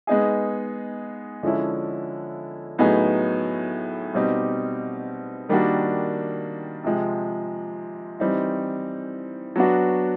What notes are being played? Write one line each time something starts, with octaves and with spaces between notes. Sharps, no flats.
G#3 B3 D#4 G#4
D3 F3 G#3 C#4 E4
A2 F#3 B3 D#4 G#4
B2 G3 C4 D#4 G4
D#3 G3 A#3 D4 F#4
C3 F3 G#3
E3 G3 C4 D#4
F#3 B3 D4 F#4